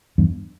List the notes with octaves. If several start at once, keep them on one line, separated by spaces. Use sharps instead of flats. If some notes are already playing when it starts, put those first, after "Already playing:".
E2 G2